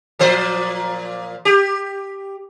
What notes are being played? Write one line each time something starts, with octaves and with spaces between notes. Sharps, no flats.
A#2 F3 C5
G4